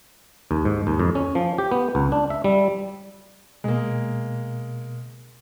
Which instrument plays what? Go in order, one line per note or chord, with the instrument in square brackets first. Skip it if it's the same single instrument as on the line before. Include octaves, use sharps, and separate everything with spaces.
[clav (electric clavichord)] D#2
G#2
D#2
F2
C#4
F3
G4
B3
C#2
D4
E5
G3
[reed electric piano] B2 [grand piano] G#3 A#3